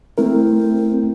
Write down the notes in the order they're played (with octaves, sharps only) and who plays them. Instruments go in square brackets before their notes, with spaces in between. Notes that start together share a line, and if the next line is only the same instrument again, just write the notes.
[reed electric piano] A3 E4 A#4 [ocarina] C4